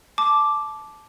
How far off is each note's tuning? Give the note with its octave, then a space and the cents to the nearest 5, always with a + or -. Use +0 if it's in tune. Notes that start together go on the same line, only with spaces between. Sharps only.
A5 -15 D6 +0